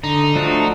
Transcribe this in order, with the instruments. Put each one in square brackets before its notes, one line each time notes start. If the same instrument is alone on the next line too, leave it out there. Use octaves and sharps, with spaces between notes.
[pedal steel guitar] D3 [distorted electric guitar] D#4
[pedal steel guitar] F3 A3 D4 F#4